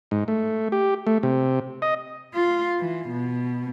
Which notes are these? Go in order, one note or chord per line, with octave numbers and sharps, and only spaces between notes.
G#2
A3
G4
A3
C3
D#5
F4
E3
B2